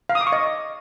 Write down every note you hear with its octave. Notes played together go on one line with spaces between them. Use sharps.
F5
D#6
D6
C#6
D#5